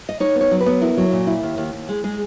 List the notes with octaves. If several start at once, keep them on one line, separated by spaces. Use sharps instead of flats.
D#5
D#4 C#5
B3
C#5
F#3
B4
B3
E4 A#4
F#3
A#2
E4
D#2
D#2
D#2
G#3
G#3 G#4